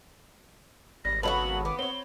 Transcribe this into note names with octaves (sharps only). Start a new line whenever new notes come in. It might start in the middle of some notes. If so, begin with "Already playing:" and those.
G#1 G3 A#6
C#3 F#3 B3 D#4 F#4 A4 F#7
B3 D6
C4 C#5 G7